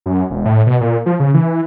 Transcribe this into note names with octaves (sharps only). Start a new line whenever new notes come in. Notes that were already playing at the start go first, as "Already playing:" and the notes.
F#2
E1
A2
B2
A#2
F3
C#3
E3